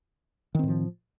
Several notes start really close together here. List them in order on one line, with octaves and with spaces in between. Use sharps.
D#3 C4 A2 F3